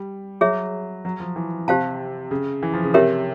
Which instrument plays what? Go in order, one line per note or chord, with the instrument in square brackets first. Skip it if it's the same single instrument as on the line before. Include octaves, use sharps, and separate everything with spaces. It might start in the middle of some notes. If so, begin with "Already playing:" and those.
Already playing: [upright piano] G3
[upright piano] F#3 [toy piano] G#4 C#5 E5
[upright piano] F#3
F3
E3
[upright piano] C3 [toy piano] G4 C5 F5 A5
[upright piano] C#3
E3
F3
C#3
[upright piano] C3 [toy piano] G4 A#4 C#5 E5